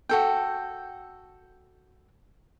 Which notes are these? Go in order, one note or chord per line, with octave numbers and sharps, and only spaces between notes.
F#4 A4 G5